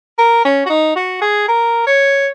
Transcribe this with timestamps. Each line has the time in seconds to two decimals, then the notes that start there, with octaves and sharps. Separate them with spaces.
0.19 A#4
0.45 C#4
0.66 F#4
0.70 D#4
0.96 F#4
1.22 G#4
1.48 A#4
1.87 C#5